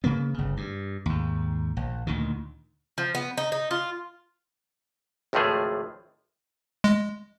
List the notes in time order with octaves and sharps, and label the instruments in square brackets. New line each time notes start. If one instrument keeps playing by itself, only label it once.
[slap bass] C#3 A#3 B3
G1 C#3
G2
D#2 G#2
A#1
D2 A#2 D#3
[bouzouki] F3
B3
D#4
D#4
F4
[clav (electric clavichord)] G#1 C#2 A2 F3 A3 G#4
[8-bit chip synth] G#3